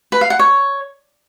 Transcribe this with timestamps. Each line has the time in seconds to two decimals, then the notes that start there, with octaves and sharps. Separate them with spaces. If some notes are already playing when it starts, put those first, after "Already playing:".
0.12 B4
0.21 F5
0.30 F#5
0.39 C#5